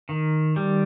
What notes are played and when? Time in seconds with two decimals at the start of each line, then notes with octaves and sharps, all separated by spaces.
0.09 D#3
0.56 G3